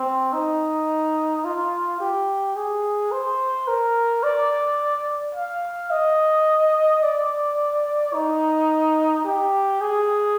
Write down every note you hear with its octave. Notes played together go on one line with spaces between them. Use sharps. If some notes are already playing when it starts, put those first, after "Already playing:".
Already playing: C4
D#4
F4
G4
G#4
C5
A#4
D5
F5
D#5
D5
D#4
G4
G#4